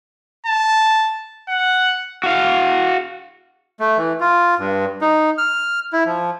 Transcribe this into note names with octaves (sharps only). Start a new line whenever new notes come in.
A5
F#5
F#4 F5
A3
E3
F4
G2
D#4
F6
E4
F3